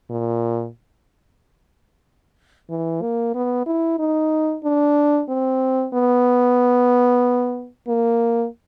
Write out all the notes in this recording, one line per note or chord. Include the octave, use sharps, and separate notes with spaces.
A#2
E3
A#3
B3
E4
D#4
D4
C4
B3
A#3